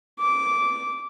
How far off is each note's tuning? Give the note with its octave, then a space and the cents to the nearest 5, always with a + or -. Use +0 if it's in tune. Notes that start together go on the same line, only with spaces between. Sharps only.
D6 -10